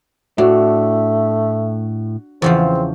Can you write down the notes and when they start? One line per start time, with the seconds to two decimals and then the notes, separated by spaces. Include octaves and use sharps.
0.38 A2 A3 D4 F#4
2.42 E2 C#3 F3 C4